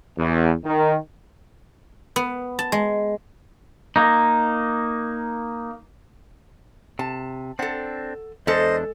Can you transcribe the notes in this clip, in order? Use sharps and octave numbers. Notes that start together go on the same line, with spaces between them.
E2
D#3
B3
A5
G#3
A#3 D#4
C3 A5
C4 D4 A4 F#5
E2 G#3 D4 A4 C5 D#5